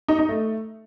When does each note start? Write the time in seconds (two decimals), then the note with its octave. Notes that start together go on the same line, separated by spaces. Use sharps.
0.08 D#4
0.19 D#4
0.29 A3